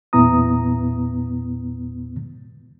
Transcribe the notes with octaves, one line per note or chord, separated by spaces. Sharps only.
E2 A#2 B3 E4 A#5 D#6